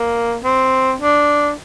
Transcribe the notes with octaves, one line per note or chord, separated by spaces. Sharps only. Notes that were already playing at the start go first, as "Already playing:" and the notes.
Already playing: A#3
C4
D4